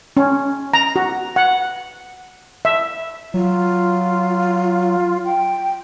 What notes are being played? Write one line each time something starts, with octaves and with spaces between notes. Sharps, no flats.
C#4
A#5
F#4
F#5
E5
F#3 F4
G5